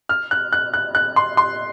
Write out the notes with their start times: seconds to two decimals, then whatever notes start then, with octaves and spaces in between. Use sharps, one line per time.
0.09 F6
0.31 F#6
0.52 F#6
0.74 F#6
0.95 F#6
1.16 C6
1.37 C6